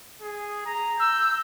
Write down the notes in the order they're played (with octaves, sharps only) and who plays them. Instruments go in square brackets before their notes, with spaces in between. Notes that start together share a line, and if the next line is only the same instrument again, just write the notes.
[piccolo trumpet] G#4
A#5
[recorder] E6 [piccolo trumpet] G6